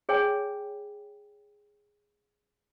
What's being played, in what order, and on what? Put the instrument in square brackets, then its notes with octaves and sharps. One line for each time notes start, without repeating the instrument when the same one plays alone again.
[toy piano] G#4 C#5 G5 G#5